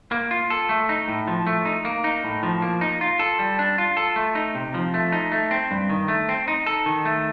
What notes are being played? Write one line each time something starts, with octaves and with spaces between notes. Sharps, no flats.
A#3
F4
A4
A3
D#4
A2
F3
A3
D#4
A#3
D#4
A2
F3
A#3
D#4
F4
A4
G3
D4
F4
A4
A3
D#4
C3
F3
A3
D#4
A3
C4
G2
D#3
A3
C4
D#4
A4
D#3
A3